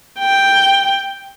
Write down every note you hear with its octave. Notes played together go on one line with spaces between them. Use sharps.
G5